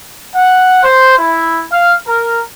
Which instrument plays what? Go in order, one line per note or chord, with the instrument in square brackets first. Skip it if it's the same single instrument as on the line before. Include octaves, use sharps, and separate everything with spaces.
[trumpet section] F#5
C5
E4
F5
A#4